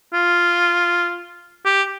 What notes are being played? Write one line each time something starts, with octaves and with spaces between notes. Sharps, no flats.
F4
G4